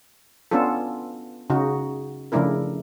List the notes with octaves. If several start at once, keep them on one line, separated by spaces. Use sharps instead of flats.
B3 C#4 D4 F4 A4
C#3 D#4 F#4
C#3 F3 A3 D4 E4 A#4